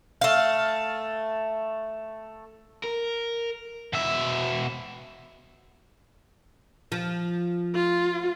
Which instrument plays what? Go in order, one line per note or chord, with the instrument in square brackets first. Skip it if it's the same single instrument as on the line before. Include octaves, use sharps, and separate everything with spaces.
[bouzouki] A3 F5
[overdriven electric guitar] A#4
B2 E5
[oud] F3
[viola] F4